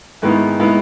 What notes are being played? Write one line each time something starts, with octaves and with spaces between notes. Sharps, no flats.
G#2 D#3 G#3 B3 E4
D#3 G#3 B3 E4